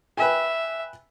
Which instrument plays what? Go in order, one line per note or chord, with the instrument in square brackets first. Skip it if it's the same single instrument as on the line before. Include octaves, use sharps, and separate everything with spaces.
[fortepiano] B4 G5 G#5 [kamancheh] E5